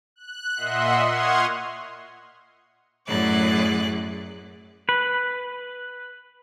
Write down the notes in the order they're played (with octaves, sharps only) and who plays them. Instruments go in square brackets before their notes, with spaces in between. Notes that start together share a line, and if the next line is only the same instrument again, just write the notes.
[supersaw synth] F#6
A#2 D#5 E5 F#5 C6
F#5 C6 C#6 D#6 F6 G#6
[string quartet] F#2 A2 G#4 D5 F#6
[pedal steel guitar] B4